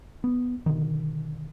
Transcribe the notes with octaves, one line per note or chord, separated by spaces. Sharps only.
B3
B2 D3 D#3